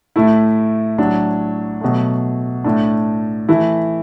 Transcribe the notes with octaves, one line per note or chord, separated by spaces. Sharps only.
A2 A3 E4
A2 F#3 D4
B2 F#3 A3
A2 A3 D4
E3 A3 E4